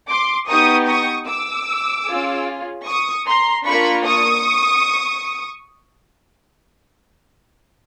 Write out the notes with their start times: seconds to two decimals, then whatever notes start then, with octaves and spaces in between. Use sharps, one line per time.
0.09 C6 D6
0.48 B3 D#4 G4 C#6 D#6
0.88 C#6 D#6
1.28 D6 E6
2.07 C#4 F4 G#4
2.86 C#6 D#6
3.26 A#5 C6
3.65 A#3 D4 F4 B5 C#6
4.05 C#6 D#6